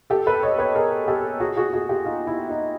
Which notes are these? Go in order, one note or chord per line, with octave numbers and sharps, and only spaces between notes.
G4 A4
A4 B4
C#5 D#5
B4 C#5
G#4 A#4
G4 A4
F#4 G#4
F#4 G#4
F#4 G#4
F4 G4
D#4 F4
E4
D#4